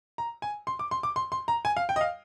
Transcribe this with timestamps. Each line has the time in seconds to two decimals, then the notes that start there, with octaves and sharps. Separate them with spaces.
0.18 A#5
0.42 G#5
0.67 C6
0.79 D6
0.91 C6
1.03 D6
1.16 C6
1.32 C6
1.48 A#5
1.65 G#5
1.77 F5
1.89 G5
1.96 D#5
2.01 F5